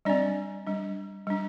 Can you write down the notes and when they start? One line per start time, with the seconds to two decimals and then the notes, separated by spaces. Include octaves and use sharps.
0.05 G3 C4 D4 D5
0.66 G3 D4
1.27 G3 D4